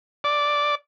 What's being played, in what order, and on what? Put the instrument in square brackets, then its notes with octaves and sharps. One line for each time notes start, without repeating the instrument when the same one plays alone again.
[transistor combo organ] D5